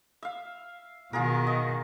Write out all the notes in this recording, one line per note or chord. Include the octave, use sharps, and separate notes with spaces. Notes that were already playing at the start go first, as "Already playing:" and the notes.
E5 F5
B2 D#3 F4 G#4 A#4
D#5